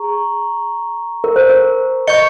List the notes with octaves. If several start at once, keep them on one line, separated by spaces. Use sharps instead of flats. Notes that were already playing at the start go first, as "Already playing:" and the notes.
Already playing: G#4 A#5 C#6
A#4
C5
A#4
D#5 C#6 G6 C#7 G7